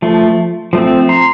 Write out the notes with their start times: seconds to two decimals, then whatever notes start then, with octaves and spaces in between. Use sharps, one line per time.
0.02 F3 A3
0.73 F3 A3 C4
1.09 A#5 C6